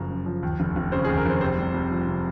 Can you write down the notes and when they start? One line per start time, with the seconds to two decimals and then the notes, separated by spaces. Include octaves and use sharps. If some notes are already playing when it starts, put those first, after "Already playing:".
Already playing: F#1 F#2 C#3 F3 A#5
0.10 F#2
0.26 F3
0.43 D#2
0.60 F1
0.76 F1
0.92 C#3 C5
1.05 G#4
1.09 D#2
1.17 A#4
1.26 F1 C5
1.41 C3 C5
1.58 C2
1.74 C2
1.91 F3
2.07 C3